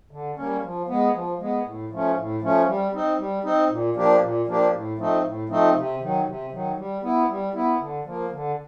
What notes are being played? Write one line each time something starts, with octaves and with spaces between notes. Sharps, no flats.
D3
G3 A#3 C#4
F3
G#3 B3
F3
G#3 B3
A2
F3 A3 C#4
A2
F3 A3 C#4
G3
C4 D#4
G3
C4 D#4
A#2
F3 A#3 D4 G4
A#2
F3 A#3 D4 G4
A2
F3 A3 C4 D#4
A2
F3 A3 C4 D#4
C3
D#3 F#3
C3
D#3 F#3
G3
B3 E4
G3
B3 E4
D3
F3 A#3
D3